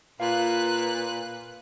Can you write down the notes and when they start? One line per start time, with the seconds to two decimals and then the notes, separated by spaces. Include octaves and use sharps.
0.20 A#2 B4 F5 F#6